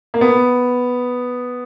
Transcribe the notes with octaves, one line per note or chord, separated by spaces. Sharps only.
A#3
B3